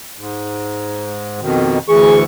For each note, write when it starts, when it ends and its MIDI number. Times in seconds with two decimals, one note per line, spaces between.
0.19 1.40 44
1.41 1.79 41
1.41 1.79 47
1.41 1.79 51
1.89 2.24 38
1.89 2.24 52
1.89 2.20 68
1.89 2.24 85